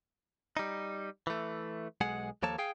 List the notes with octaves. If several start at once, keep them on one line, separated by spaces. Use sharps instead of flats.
G3 D#4
E3 A3
B1 G#3 G#4 F#5
D#2 F3 A#3 A4 C#5 A5
G#4 F5 G5